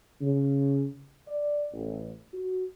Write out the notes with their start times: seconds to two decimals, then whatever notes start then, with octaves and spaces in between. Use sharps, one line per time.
0.21 C#3
1.27 D5
1.73 A1
2.34 F#4